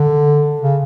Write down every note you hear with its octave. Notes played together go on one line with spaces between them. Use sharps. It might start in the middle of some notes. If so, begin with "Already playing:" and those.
Already playing: D3
C#3